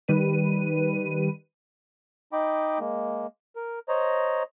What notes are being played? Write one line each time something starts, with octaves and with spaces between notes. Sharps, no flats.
D#3 G3 B4 D#7
D#4 D#5 G5 B5 D6
G#3 A#3
A#4
C5 C#5 D#5 A#5